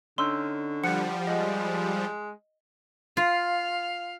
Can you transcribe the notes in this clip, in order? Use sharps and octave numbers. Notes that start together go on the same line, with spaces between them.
D3 C#4 D#4 C6 E6 F6
F3 G3 F#5 C#7
G#3 D#5
F4 F5